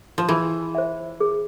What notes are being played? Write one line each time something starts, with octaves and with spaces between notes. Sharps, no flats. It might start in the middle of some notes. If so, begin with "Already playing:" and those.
F3
E3 G#4
C5 E5
G#4